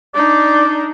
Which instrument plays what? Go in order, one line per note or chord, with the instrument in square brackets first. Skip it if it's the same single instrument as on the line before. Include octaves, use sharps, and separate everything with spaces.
[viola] D4 D#4 [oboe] D5